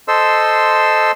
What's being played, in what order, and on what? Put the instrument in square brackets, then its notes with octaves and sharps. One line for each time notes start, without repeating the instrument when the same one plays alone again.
[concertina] A4 C5 D#5 C6 E6